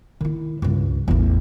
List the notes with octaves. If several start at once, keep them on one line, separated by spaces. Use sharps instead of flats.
D#3 E4
C#2 G2
A1 E2